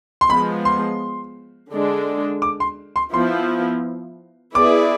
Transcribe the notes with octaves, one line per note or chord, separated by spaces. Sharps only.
C6
F3 G#3 B3 B5
C6
D3 G#3 D4
D6
C6
C6
F3 B3 E4 C6
B3 E4 G#4 B4 D5 D6